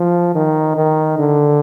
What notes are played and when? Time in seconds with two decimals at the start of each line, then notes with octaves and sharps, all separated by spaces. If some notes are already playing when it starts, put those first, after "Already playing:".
Already playing: F3
0.35 D#3
0.77 D#3
1.19 D3